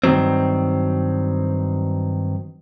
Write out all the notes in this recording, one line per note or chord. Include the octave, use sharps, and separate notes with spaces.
G2 D#3 E3 F#3 C4